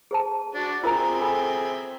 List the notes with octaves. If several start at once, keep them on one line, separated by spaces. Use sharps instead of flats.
G#4 C5 A5
D4 F#4
C4 F4 G#4 A#4 E5 A#5
A4 G#5 B5